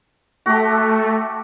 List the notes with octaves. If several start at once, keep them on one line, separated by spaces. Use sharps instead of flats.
A3 F#4 G4